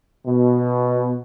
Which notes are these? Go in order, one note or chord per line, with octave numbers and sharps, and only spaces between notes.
B2